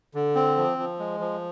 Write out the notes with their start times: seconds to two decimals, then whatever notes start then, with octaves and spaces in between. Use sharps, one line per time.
0.14 D3
0.35 C4
0.57 F3
0.78 F3
0.99 G#3
1.20 F3